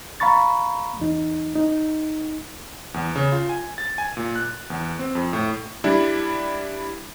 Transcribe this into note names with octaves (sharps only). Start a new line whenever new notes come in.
F5 A#5 B5 C#6 A6
E2 D#4
D#4
E2
C#3
F4
G#5
A6
G#5
A#2
F#6
E2
C4
F2
A2
G3 D4 E4